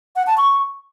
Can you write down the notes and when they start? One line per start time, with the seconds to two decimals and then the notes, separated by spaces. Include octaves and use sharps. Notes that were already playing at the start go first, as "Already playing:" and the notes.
0.16 F#5
0.27 A5
0.38 C#6